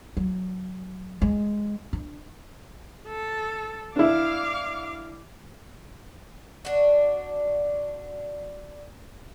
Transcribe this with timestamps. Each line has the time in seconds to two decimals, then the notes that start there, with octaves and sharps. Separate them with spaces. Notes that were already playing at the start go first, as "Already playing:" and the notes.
0.17 F#3
1.22 G#3
1.93 D4
3.08 A4
3.96 D4 E4 F5 D6
6.65 D4 F#4